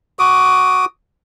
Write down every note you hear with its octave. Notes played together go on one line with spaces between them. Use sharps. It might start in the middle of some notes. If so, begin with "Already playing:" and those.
F#4 D6 D#6